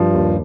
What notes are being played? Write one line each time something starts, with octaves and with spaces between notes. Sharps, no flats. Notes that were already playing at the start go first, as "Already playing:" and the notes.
Already playing: G2 F3
D#2